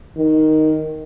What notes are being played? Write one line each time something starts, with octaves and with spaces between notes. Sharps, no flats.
D#3